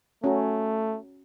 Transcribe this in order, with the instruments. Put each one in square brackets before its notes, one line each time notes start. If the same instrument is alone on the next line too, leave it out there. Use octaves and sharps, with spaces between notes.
[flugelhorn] A3 [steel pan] C#4 F#4 A#5